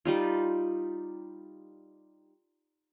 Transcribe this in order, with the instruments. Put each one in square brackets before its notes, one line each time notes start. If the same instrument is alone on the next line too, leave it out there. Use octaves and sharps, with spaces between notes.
[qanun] G3 D#4 F4